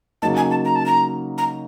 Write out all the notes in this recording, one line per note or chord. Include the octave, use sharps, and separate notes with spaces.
C#3 F#3 A#3 D#4 A5
G#5
A5
A#5
A5
A#5
A#5